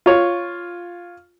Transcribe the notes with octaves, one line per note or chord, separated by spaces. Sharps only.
F4 C#5